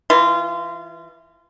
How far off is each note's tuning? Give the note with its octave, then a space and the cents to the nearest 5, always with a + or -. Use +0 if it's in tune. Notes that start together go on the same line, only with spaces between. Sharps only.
E3 +0 F4 -25